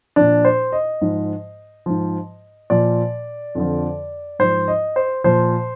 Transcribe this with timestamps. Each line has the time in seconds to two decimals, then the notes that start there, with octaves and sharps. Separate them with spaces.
0.16 A#2 F3 D4
0.45 C5
0.72 D#5
1.02 G#2 F3
1.86 G#2 F3
2.70 A#2 F3 D5
3.55 F2 D3 F3
4.39 G#2 F3 C5
4.68 D#5
4.96 C5
5.24 A#2 F3 C5